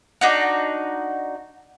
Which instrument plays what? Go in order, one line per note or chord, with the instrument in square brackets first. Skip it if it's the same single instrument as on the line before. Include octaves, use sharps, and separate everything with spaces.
[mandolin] D4 D#4 F#4